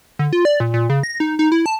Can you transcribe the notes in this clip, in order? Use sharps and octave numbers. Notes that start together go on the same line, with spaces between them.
D3
F4
D5
A#2
A#2
C#3
A#6
D#4
D#4
E4
A5